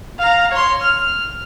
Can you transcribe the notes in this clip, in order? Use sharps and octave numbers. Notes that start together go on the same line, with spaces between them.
F5 A#5
C#5 C6
F6